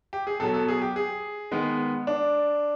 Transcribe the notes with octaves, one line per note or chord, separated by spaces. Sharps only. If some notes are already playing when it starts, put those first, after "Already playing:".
G4
G#4
B2 F#3 B3 A4
A4
G#4
G4
G#4
D#3 G#3 B3
D4